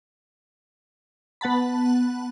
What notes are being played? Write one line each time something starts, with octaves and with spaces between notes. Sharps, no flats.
B3 F#5 A5 B5